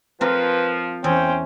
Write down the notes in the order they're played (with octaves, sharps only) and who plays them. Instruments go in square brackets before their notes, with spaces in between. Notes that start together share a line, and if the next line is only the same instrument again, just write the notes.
[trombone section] F3 [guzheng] C4 A#4 [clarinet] B4
[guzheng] E2 [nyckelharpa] C#4 C5 [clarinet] G5